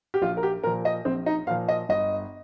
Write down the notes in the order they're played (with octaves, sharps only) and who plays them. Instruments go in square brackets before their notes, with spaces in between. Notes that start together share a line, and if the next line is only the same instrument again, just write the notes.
[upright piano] G4
A#1 F4
A#4
G4
A#2 F3 A#4
D#5
A#1 C4
D#4
A#2 F3 F5
D#5
G1 D#5